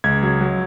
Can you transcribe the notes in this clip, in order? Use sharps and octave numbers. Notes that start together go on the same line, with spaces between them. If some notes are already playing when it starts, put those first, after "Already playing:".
C#2 G#6
F#3
F#3